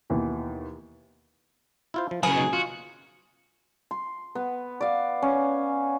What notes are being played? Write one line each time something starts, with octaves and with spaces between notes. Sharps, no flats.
D#2 B2 E3
E4 F4 C5
F3
C#3 F#3 G#4 A#4 B4
B2 D#4 F#4
F4 F#4
C6
B3
D5 F5
C#4